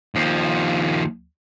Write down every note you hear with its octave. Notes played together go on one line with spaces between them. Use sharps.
D#2 F3